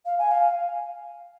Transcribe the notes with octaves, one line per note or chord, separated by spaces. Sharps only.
F5
G#5
F5